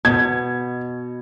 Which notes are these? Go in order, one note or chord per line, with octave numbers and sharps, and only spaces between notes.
B2 G#6